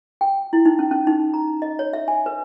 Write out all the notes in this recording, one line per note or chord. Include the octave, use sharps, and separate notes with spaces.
G5
E4
D#4
C#4
C#4
D#4
A#5
D#5
C#5
E5
G#5
B4